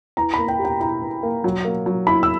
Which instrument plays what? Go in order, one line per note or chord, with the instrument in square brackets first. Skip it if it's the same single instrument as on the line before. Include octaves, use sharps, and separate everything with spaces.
[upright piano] E3 [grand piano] A#5
[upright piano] A#3 [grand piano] B5
[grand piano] G5
[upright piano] G4
[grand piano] G5
[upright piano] E4 [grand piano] A#5
[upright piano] E3
A#3
F#3
A#3
F#3
[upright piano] E4 [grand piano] B5
[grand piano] E6